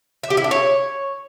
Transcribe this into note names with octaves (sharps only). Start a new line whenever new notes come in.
E5
G4
E4
D4
C#5